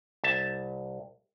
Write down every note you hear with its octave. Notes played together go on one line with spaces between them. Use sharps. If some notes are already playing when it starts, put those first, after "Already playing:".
C2 E5 A5